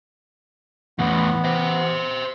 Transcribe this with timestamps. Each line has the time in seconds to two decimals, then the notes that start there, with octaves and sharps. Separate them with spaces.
0.99 E2 A2 E3 B3
1.44 C5 E5